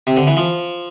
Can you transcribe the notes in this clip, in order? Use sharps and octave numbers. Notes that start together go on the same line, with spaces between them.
C3
D3
E3
F3